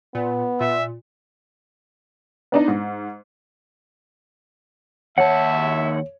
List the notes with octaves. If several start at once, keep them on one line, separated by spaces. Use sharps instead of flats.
A#2 B3
A#2 E5
B3 D4 D#4
G#2
D#2 C#5 E5 F#5 A5